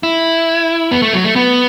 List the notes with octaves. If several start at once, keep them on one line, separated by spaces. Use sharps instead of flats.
E4
B3
A3
F#3
A3
B3